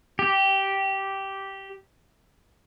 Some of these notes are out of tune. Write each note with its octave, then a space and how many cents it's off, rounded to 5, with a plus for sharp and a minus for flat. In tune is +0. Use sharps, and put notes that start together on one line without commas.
G4 -10